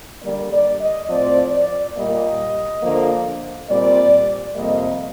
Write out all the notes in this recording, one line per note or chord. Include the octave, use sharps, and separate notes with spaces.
D3 G3 A#3 D5
D5
D#5
A2 F3 C4 D5
D5
A#2 G3 A#3 D#5
D3 F3 A#3
A#2 G3 C4 D5
F2 C3 G3 A#3 D#5